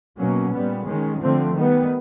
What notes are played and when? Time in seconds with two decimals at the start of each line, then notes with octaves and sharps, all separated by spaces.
0.18 B2 F#3 A#3 C#4
0.53 A#2 G3 B3
0.87 D#3 G#3 C#4
1.22 D3 F3 A3 C4
1.56 D#3 G3 B3